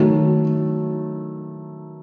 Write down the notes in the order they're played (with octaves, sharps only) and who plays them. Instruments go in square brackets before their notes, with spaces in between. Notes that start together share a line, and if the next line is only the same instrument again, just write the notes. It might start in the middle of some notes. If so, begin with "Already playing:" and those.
Already playing: [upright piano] D#3 F#3 A3